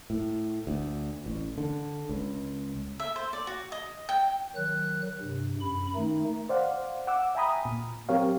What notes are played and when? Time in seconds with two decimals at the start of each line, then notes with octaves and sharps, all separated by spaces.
0.10 A2
0.67 D2
1.26 A1
1.58 D3
2.09 C#2
3.00 E5
3.16 C5
3.33 D5
3.47 F#4
3.72 D#5
4.09 G5
4.55 D#3 F#3 F#6
5.21 G2 C3
5.60 F#2 B5
5.96 D#3 A3 D#4
6.49 C5 D5 F5 F#5
7.07 F#5 D6 E6
7.35 E5 G5 G#5 A#5 B5 D#6
7.65 A#2
8.09 F#3 C4 G4 A#4 C#5 F5